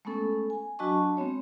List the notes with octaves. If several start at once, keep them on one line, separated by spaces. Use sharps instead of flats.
G#3 A3 B3 C#4 A4
G#5
F#3 D4 F#4 D#5 A5 C#6
G#3 B3 C4 C#5